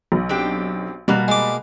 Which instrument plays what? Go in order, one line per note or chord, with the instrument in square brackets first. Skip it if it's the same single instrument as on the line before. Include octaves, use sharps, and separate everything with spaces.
[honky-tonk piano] B1
[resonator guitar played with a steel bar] C4 D4 G4
[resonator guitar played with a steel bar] B2 A#3 F#4 [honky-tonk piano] G3
[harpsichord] G#3 D6